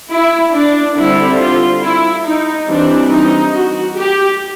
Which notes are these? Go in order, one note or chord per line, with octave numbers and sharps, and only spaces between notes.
E4
D4
D3 G3 C4 E4
F4
E4
D#4
E3 G3 C4 D4
D#4
F#4
G4